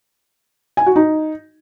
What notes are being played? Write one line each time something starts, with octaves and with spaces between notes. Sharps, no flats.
G#5
F#4
D#4